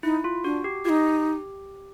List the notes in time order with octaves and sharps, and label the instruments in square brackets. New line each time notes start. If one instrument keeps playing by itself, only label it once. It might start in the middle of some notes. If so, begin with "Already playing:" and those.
[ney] D#4 [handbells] E4
[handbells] F4
[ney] D4 [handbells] F#4
[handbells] G4
[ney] D#4 F4 [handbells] G4